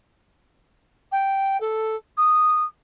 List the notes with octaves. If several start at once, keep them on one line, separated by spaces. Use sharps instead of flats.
G5
A4
D#6